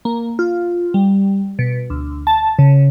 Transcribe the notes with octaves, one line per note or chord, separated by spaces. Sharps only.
A#3
F4
G3
B2
D2
A5
C#3